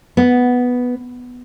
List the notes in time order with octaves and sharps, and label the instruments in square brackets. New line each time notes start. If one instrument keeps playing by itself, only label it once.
[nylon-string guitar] B3